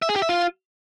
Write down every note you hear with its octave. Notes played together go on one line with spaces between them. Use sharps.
E5
G#4
G4
E5
F4